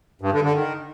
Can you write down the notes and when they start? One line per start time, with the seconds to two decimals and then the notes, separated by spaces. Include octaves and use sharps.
0.21 G2
0.32 D3
0.43 D3
0.54 D#3